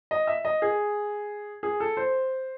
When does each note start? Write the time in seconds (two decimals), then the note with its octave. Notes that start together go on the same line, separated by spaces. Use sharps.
0.11 D#5
0.27 E5
0.45 D#5
0.62 G#4
1.63 G#4
1.80 A4
1.97 C5